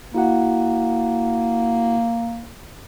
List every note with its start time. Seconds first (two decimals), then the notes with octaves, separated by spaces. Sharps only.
0.15 A#3 E4 F#4 F#5